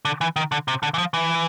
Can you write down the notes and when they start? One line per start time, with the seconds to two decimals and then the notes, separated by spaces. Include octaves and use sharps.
0.05 D3
0.21 E3
0.36 D#3
0.52 D3
0.68 C3
0.83 D3
0.94 E3
0.98 F3
1.14 E3